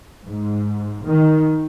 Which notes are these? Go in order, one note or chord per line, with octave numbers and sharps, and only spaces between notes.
G#2
D#3